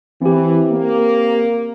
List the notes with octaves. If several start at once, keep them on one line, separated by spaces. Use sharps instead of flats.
E3 C4 G4
A#3